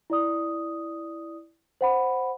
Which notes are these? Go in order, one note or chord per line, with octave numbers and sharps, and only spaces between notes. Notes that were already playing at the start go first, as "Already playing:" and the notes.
E4 D5 D#6
C5 F#5 B5